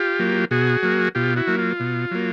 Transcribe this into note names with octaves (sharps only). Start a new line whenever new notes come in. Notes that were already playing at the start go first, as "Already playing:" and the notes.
Already playing: F4 G4
F#3 A#3
B2 F#4 G#4
F#3 A#3
B2 F4 G4
E4 F#4
F#3 A#3
F4
B2
F#3 A#3